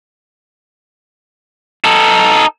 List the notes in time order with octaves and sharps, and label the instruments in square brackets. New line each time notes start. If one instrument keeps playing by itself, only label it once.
[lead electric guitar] D#4 A4